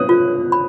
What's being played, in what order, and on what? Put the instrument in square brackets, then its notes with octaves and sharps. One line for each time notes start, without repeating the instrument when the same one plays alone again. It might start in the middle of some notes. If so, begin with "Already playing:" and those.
Already playing: [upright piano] D#6 F#6
[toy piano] F4
B5